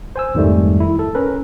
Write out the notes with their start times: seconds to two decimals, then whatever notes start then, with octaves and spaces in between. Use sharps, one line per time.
0.16 C5 G#5 E6
0.35 F2 G#2 D#3 G3 A3
0.80 E4
0.99 A4
1.15 C#4 A#4 B4